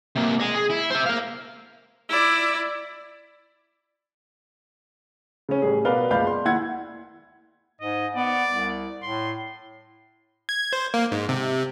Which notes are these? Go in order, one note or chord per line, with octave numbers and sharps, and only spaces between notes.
C3 A#3
D#5 G#5
G#4
E4
C5 E5
A#4 F5
E4 D5
C#3 C#4
A1 G3 G#4
B2 A#4 B4 D5 F5 G7
F#1 C#2 D5 F5 B5 G6
C6
D#2 E4 F#5 G#6
G#2 D#5
B3 D5
C2
A2 C6
G#6
C5
A#3
G#2
C3